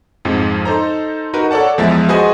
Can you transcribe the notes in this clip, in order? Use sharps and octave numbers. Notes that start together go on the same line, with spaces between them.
F2 G#2 F3
D#4 A4 C5 A#5
D#4 F#4 A#4 B4
A4 C#5 D5 F#5 A5
E2 F3 G#3 G#4 E5 A6
F#4 G#4 B4 C5 D#5 G#5